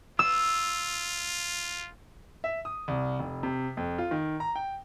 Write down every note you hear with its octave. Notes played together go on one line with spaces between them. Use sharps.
F4 E6
E5
D#6
C2
F1
C3
F2
F4
D#3
A#5
G5